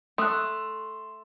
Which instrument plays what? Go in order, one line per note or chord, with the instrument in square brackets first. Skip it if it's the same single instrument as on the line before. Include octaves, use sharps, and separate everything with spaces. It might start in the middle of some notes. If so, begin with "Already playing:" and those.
[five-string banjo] A3 [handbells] C6 [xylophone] D#6 E6 F#6